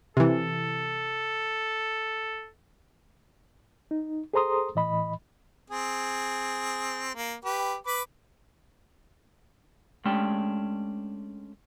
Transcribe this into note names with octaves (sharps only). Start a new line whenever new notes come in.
C3 E3 A4
D#4
G#4 A4 C5 A#5 C6 D#6
A2 E3 D#5 B5
C4 G#4
A#3
G4 B4
B4 B5 D6
G#3 A3 C#4 D4 G4 G5